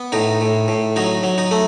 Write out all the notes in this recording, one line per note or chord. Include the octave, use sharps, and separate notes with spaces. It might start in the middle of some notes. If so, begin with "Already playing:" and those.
Already playing: B3
A2 D#4
A2
A2
F#3 D#4
F#3
D#4
A3